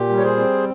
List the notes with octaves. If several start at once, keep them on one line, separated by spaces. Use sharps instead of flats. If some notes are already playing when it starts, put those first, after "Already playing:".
Already playing: A#2 G4
G3
C#5
G#4 C5
C4